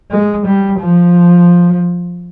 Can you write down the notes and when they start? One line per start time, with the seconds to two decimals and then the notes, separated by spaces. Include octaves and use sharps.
0.11 G#3
0.46 G3
0.80 F3